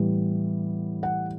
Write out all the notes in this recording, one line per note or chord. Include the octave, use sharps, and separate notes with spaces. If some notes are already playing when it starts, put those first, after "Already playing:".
Already playing: A2 E3 G3 B3
F#5